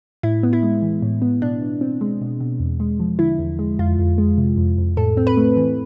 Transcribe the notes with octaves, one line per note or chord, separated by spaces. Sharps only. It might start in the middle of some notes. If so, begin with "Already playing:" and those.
A2 E4
B3
E4
G#3
E3
A2
B3
B2 D4
B2
C4
G#3
B2
B2
E2
G#3
F3
D3 E4
E2
G#3
F2 F4
F2
G#3
C3
F2
F2
A2 A4
C4
B4
A3
E3